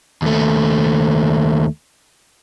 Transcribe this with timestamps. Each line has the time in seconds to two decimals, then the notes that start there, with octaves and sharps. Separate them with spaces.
0.22 D#2 A3